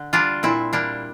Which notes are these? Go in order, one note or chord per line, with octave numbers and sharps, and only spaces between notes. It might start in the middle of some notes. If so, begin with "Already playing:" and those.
Already playing: D3
G3 D4 F4
A#2 C4 E4
G3 A#3 D4